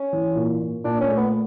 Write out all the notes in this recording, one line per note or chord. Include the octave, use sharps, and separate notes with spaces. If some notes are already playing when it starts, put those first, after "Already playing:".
Already playing: C#4
E3
A#2
A#2
A#2 D4
C#4
A3
B3